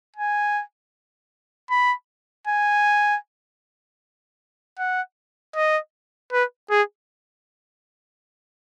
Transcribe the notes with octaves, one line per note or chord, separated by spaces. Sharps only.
G#5
B5
G#5
F#5
D#5
B4
G#4